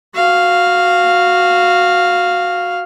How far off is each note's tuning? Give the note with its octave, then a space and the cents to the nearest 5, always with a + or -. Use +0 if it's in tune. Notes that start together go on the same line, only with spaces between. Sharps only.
F#4 -10 F5 +0